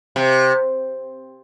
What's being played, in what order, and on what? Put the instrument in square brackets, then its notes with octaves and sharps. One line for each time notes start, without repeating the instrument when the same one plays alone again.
[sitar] C3